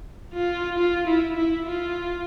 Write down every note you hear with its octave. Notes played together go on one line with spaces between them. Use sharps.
F4
F4
E4
E4
F4